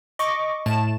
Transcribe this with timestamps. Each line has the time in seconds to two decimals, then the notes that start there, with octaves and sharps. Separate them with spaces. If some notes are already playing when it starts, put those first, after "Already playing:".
0.19 D#5 C#6 D6
0.66 A2 A3 A5 E7